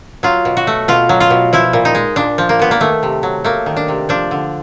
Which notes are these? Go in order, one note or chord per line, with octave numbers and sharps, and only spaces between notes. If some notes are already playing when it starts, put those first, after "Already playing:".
F#3 F4
B2
F#4
A3
B2 F4
F#3
F4
B2
F3 E4
A#2
D#4
G#3
A#2 D4
F3
A#3
A#2 B3
A#3
D#3 A3
C3
F#3
A3 A#3
D#3
D4
C3
F3 D4
D3